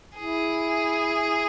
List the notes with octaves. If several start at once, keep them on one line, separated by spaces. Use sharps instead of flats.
E4 G#4